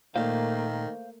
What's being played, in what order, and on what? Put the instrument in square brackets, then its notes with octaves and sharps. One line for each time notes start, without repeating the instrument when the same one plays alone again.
[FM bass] A#2 [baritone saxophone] D#3 [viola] A3 A#3 [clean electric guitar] C5 F5